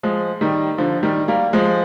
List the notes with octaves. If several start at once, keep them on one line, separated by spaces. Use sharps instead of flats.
F3 G#3
D#3 G3
D3 F3
D#3 G3
G3 A#3
F3 G#3